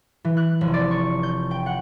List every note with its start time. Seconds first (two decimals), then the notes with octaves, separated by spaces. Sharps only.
0.25 E3
0.37 F#6
0.61 F1
0.74 D5
0.91 C#6
1.23 G6
1.51 G5
1.66 F#5